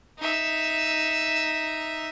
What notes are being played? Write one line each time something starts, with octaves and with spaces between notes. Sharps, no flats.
D#4 E5